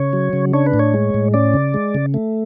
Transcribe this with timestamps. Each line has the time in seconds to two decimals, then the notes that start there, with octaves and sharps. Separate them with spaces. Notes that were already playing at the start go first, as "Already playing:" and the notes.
Already playing: C#3 C#5
0.13 F#3
0.33 C#3
0.53 D4 C#5
0.66 B4
0.74 A2
0.79 C#5
0.94 G#3
1.14 A2
1.34 C#4 D5
1.54 C#3
1.74 G#3
1.94 C#3
2.14 A3